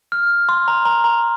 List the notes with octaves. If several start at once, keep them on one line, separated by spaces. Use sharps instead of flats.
F6
C6
A#5
A#5
A#5